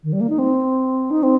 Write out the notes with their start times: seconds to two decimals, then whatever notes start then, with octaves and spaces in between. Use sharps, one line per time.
0.04 D#3
0.13 G3
0.21 A#3
0.29 D#4
0.38 C4
1.11 D#4
1.23 C4